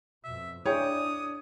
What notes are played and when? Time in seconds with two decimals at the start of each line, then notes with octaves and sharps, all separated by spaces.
0.24 F2 B2 E5
0.66 D4 E4 G#4 C#5 G5 D#6